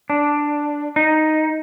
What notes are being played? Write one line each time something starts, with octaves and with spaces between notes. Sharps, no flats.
D4
D#4